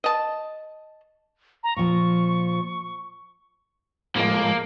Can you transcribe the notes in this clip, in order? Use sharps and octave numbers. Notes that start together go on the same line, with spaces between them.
D#5 A5
A#5
A#2 F3 C#6
A2 F3 G#3 A#3